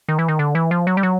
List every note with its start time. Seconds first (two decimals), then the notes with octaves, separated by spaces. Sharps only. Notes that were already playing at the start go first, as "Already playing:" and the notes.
0.09 D#3
0.19 E3
0.28 D#3
0.39 D3
0.55 E3
0.71 F3
0.87 F#3
0.97 G3
1.03 F#3